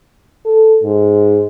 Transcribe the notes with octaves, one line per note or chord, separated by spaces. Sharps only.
A4
G#2